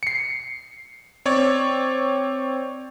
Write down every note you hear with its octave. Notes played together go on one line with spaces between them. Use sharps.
C7 C#7
C4 C#5 D5